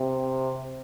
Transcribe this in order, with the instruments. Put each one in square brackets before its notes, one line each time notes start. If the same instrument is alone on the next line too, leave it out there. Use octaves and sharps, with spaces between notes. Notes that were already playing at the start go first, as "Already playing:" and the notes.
Already playing: [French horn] C3